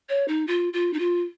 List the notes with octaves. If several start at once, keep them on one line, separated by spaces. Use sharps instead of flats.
C#5
D#4
F4
F4
D#4
F4